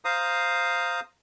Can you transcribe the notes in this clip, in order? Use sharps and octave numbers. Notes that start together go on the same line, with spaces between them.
C5 F5 A#5 D#6